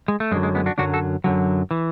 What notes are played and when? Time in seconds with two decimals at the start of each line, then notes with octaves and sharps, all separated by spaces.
0.08 G#3
0.20 A3
0.31 F#2 D3 F#3 G#3
0.43 G#3
0.55 G#3 B3
0.66 D4 F#4
0.78 F#2 D3 F#3 D4 F#4
0.93 F#4 A4
1.24 F#2 D3 F#3
1.71 E3